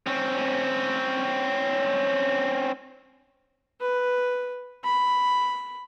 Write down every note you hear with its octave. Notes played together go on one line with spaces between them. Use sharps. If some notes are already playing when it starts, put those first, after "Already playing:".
C4 C#4
B4
B5